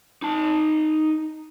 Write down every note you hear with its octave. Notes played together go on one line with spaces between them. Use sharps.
D#4 A5